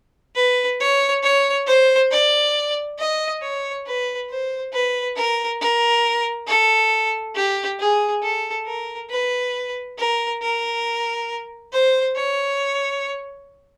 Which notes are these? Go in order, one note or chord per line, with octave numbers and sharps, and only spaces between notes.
B4
C#5
C#5
C5
D5
D#5
C#5
B4
C5
B4
A#4
A#4
A4
G4
G#4
A4
A#4
B4
A#4
A#4
C5
C#5